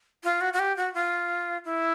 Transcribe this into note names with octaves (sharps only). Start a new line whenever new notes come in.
F4
F#4
F#4
G4
F#4
F4
E4